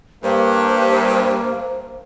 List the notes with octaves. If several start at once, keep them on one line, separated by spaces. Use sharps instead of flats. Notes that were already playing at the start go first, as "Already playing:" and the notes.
G2 A#3 A#4 C5